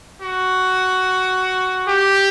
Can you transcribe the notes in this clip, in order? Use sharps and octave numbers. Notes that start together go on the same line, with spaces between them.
F#4
G4